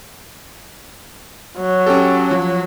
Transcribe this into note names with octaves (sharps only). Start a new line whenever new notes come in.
F#3
C#4 G4 A4
F3